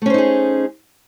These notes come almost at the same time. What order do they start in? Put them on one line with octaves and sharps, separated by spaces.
A3 C#4 C5 D#4 G#4